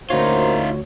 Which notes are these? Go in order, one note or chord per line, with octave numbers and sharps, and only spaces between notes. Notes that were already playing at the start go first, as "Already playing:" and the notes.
D2 A#2 D#4 F4 F#4 A#4 C5 C#5